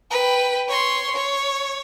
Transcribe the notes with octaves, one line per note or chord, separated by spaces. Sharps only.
B4 G5
C#5 C6
C#5